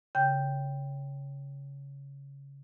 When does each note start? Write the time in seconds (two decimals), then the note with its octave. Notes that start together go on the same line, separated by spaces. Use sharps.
0.15 C#3 G5 G6